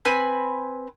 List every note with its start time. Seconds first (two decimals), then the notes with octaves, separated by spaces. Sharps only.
0.05 C4 B4 G#5 B5